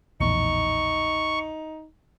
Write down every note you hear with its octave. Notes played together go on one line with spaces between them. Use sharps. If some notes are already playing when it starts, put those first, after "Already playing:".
A#1 E2 A2 D#4 C#6